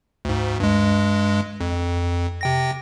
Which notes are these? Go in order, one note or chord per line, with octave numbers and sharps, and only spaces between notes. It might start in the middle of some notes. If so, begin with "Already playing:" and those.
D2 G#2
G2 G#3
F2
C3 G5 A#6